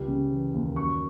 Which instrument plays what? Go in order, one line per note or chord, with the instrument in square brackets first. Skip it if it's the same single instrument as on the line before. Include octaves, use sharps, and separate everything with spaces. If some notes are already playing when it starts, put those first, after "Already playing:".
Already playing: [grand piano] C#2 G3
C#3
E3
D#2
F#2 C#6